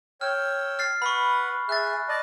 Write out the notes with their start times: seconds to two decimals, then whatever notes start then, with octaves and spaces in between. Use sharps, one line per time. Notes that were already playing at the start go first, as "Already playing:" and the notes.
0.21 C#5 G5 E6 F6
0.79 F6 A6 C7
1.02 B4 F#5 B5 C#6
1.69 G#4 E5 F#6 A6
2.09 D5 D#5 A5